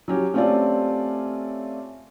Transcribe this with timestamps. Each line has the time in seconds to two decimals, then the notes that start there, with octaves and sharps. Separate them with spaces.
0.08 F#3 C#4 G4
0.34 A3 C4 C#4 F4 G4 D5